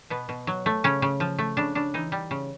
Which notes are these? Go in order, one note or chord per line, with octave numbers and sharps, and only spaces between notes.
B2 B3
B2
F#3
A3
C#3 C#4
C#3
F3
A3
C#3 D4
C#3 D4
E3 D#4
G3
C#3